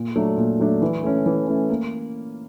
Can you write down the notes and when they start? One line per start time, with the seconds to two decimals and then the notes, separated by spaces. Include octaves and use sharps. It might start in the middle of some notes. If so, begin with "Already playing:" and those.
Already playing: A#2
0.16 F#3 A3 D4
0.37 A#2
0.59 F#3 A3 D4
0.82 E3
1.03 A3 C#4
1.26 E3
1.47 A3 C#4
1.70 A#3